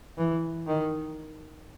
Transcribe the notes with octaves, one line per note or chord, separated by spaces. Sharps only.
E3
D#3